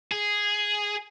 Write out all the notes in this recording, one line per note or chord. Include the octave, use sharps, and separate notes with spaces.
G#4